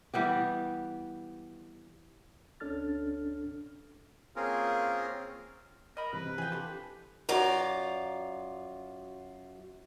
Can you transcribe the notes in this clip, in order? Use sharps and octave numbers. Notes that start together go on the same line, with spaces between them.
E3 G3 B3 G4
D2 C#4 D4 A4 F6 A6
A#3 C4 C#4 F4 G#4 A#4
A#4 D#5 B5
G2 C3 E3 B4
C3
E3 F3 G#4 G5
F3 D4 G4 A4
F#2 F4 D5 A#5